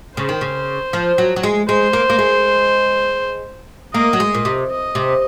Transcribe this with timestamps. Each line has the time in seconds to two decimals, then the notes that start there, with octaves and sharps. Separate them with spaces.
0.17 C#3 C5
0.29 D#3
0.41 C#3
0.93 F3
1.18 F#3
1.36 F#3
1.43 G#3
1.69 G#3 C5
1.93 A#3
2.10 A#3
2.19 G#3
3.94 A#3 D#5
4.13 F#3
4.20 G#3
4.34 A#2
4.45 C3
4.71 D#5
4.95 C3